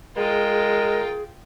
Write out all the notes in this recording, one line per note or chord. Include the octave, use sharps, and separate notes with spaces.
G#3 F4 G#4 A#4 G5